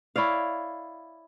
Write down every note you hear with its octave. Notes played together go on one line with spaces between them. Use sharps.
E4 C#5 D5 F5